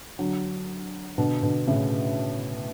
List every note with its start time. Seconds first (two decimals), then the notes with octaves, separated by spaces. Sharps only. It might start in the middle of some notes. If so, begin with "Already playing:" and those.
0.19 D3 F#3
1.18 B2 D3
1.43 B2 D3
1.67 A2 C#3